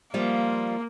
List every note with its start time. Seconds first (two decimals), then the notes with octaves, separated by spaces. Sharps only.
0.14 F3 G3 A#3 F4